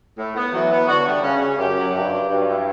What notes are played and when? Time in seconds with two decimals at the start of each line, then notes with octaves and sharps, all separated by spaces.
0.18 A2
0.35 B3
0.52 E3 F#3
0.71 B3
0.88 D3 F#4
1.06 G3
1.23 C#3 C#4
1.41 C#4
1.59 F#2 G4
1.76 F#3
1.94 G2 G4
2.12 F#3
2.30 G2 C#4
2.47 E4